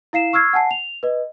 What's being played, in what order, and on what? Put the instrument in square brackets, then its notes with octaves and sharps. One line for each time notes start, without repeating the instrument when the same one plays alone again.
[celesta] E4 F5 C7 E7
C#6 E6 F6 G#6 C7
F#5 G#5 A5 C7
F7
B4 D#5